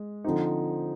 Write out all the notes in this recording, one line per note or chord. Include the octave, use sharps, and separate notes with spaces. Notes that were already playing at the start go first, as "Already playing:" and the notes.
Already playing: G#3
D3 F3 C4 D#4